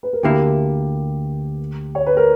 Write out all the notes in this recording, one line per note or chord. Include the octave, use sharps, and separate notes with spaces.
B4
A#4
D2 D3 A#3 E4 G4
C#5
B4
A#4